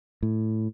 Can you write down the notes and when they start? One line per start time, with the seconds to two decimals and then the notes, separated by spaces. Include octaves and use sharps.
0.23 A2